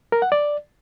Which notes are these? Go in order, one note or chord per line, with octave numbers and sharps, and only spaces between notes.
A#4
F#5
D5